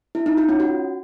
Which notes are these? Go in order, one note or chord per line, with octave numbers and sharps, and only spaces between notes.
E4
D#4
F4
C#4
F#4